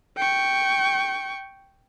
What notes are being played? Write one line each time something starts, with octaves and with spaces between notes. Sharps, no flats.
G5 C#6